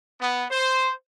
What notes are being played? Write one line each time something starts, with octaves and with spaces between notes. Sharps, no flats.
B3
C5